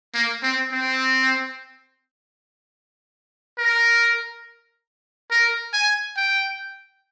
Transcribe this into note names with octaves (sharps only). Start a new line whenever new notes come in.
A#3
C4
C4
A#4
A#4
G#5
G5